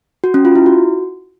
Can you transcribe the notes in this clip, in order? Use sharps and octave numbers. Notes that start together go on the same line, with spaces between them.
F#4
C#4
F4
E4
F#4